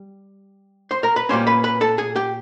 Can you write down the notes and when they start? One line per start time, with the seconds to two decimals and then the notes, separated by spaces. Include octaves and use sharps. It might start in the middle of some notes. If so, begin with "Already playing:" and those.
Already playing: G3
0.91 C5 C6
1.03 A#4 A#5
1.16 B4 B5
1.29 A#2 G3 A#3 C#4 C5 C6
1.47 B4 B5
1.64 B4 B5
1.81 A4 A5
1.98 G#4 G#5
2.16 G4 G5